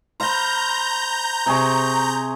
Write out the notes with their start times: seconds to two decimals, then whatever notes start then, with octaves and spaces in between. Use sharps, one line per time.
0.20 C5 F5 A#5 B5 G6
1.46 C3 G#4 C#6